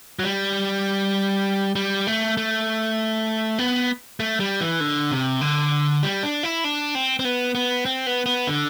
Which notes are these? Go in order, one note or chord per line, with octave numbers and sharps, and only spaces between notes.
F#3
G3
G3
A3
A3
B3
A3
G3
E3
D3
C3
D3
G3
D4
E4
D4
C4
C4
B3
B3
C4
B3
B3
D3